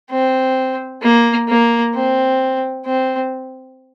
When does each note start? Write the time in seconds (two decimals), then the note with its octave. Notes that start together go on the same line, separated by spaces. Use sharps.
0.10 C4
1.02 A#3
1.49 A#3
1.94 C4
2.85 C4